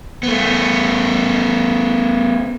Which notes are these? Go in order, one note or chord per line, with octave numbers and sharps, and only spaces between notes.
A3 B3